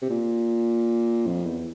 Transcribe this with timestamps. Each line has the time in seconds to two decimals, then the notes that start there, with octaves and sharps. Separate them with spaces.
0.02 C3
0.10 A#2
1.27 F2
1.46 E2